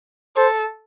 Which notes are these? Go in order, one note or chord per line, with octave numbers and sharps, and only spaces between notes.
A4 C5